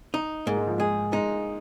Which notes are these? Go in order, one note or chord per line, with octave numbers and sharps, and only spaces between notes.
D#4
G#2 A#3
G#3
F3
G#3 G#4
G#3 D#4